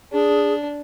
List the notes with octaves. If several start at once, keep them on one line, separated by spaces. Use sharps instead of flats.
D4 G#4